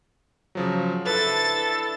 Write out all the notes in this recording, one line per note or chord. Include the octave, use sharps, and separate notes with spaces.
C#3 F3 F#3
D4 E4 A4 B4 A6